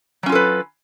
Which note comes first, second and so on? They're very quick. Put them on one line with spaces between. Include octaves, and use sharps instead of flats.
F#3 C#4 F4 A4 B4